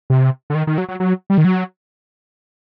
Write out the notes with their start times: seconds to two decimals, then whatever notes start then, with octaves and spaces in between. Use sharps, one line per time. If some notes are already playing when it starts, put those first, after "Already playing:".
0.10 C3
0.50 D3
0.55 D#3
0.67 D#3
0.78 F#3
0.88 F#3
1.00 F#3
1.30 G3
1.38 D#3
1.45 F#3